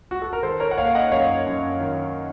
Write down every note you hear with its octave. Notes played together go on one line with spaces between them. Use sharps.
F#4
A4
A#4
D#3 A4 C5
A#4 C#5
F#5
A#3 C#5 F5
D#5 F#5
F#2 C#5 F5
F#2
D#3